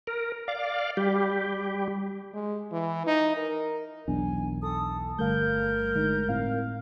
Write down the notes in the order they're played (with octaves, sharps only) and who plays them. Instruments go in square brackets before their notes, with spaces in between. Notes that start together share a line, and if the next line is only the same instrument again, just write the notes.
[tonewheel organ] A#4
D5 F5
G3 G4
[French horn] G#3
E3
D#4
A#4
[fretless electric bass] B1 E2 [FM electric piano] D4 [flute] G#5
[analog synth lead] A4 [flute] D#6
[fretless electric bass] G1 A3 [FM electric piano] D3 G3 F5 [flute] A#4 [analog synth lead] G6
[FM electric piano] D3 G#3 D#4
[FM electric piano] A2 C4 E4 [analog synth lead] F5